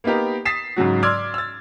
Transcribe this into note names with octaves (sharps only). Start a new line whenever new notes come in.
A#3 B3 D#4 G4 A#4
D#6 A6 B6 C7 E7
G#2 C#3 F#3 F#4
D5 C6 D6 E6 F6 G#6
E6 A6